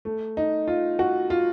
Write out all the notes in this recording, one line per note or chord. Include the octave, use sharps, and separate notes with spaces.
A3
D#4
F4
F#4
F4